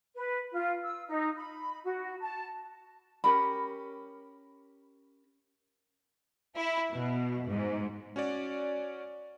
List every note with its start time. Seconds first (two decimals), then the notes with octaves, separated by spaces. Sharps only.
0.15 B4
0.52 F4
0.83 E6
1.07 D#4
1.36 B5
1.84 F#4
2.19 A5
3.24 C#4 G4 A#4 B5
6.56 E4
6.92 B2
7.47 G#2
8.16 C#4 F#4 C#5 D5